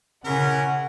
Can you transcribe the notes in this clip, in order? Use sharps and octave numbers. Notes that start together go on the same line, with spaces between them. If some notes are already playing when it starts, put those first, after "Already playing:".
C#3 E3 C#4 A#4 F#5